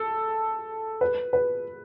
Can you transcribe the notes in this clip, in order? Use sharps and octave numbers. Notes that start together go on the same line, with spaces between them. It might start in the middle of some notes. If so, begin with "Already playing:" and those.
Already playing: A4
B4
B4